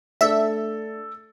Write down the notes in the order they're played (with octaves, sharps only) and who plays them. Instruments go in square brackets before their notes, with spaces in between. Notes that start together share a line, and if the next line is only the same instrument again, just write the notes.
[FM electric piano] A3 D4 [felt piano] A4 [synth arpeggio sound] E5